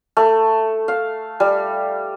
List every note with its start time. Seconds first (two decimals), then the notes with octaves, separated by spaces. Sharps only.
0.17 A3
0.88 F5
1.40 G3